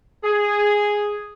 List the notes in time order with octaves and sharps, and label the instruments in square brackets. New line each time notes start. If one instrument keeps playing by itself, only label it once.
[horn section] G#4